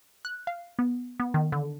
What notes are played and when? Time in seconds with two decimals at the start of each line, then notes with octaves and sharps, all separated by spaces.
0.25 F#6
0.47 F5
0.79 B3
1.20 B3
1.34 D#3
1.52 D3